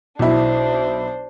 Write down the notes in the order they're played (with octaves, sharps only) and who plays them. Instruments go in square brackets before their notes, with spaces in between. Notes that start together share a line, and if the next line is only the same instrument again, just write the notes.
[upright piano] B1 E4 [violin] D4 C5